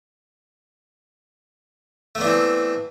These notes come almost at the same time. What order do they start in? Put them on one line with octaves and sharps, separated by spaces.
A3 B3 D4 E3 C4